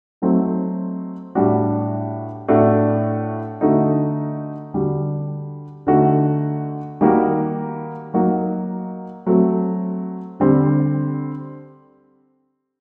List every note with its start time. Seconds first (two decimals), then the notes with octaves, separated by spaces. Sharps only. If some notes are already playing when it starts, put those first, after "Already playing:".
0.22 F#3 A3 C4 D#4 F#4
1.35 A2 G3 D4 F#4
2.48 A2 A3 D4 F#4
3.61 D3 A3 D#4 F#4
4.74 D3 G3 D4 F#4
5.87 D3 A3 D#4 F#4
7.01 D#3 G3 A#3 F#4
8.14 F#3 A#3 D#4 F#4
9.26 F#3 A3 C4 F#4
10.40 D3 G3 C4